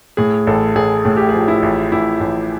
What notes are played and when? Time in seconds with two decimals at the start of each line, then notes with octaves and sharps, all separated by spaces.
0.17 A2 G#4
0.47 A1 A4
0.75 A1 G#4
1.05 A2 G#4
1.17 G4
1.29 G#4
1.34 F3
1.48 E4
1.63 A1
1.92 A1 E4
2.20 A1